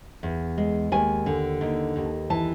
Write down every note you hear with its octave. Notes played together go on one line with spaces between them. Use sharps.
E2
G#3
D#2 G#5
D3
D#2
D#2
E3 A5